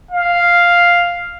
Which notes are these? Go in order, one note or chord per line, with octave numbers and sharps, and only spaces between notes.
F5